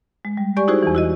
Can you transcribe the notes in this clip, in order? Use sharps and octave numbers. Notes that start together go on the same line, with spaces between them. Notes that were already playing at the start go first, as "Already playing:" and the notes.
G#3
G3
G4 D5 G#5 C#6
D#4 E4 F#4 G#4 C5
E2 E3
E4 F#4 D#5